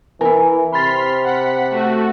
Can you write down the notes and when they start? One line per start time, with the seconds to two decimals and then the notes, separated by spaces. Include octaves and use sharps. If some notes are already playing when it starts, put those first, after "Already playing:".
0.21 E3 E4 A#4 G#5
0.72 C3 B5 C6 F6 A6 B6
1.24 F#5 B6
1.71 A3 F#4